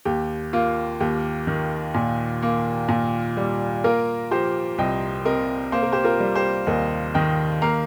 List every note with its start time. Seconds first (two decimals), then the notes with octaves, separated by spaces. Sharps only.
0.05 D#2 G4
0.53 A#3 F4
1.00 D#2 G4
1.47 D#3
1.95 A#2
2.43 A#3
2.89 A#2
3.37 G3
3.84 A#3 F4 A#4
4.31 F3 G4 C5
4.78 C2 D#5 G5
5.25 C3 A#4 D#5
5.72 A#3 C5
5.83 A#4
5.92 G4 C5
6.04 F4 A#4
6.20 G3
6.35 G4 C5
6.67 D#2 A#4 D#5
7.14 D#3 D#5 G5
7.62 A#3 F5 A#5